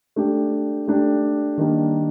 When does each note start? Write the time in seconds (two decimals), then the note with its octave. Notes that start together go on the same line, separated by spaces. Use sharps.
0.16 A3 D4 G4
0.88 A3 D4 G4
1.58 D#3 G3 A#3 D4